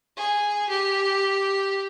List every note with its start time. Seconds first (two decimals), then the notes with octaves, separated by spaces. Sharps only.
0.17 G#4
0.69 G4